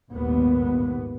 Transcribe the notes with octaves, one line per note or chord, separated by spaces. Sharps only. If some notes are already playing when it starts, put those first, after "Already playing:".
G#1 D#2 A#2 B3